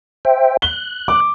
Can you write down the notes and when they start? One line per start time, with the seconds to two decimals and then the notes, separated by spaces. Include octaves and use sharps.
0.25 C5 E5 G5
0.62 F#6 G7
1.08 D6